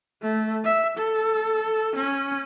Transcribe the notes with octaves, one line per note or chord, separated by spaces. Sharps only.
A3
E5
A4
C#4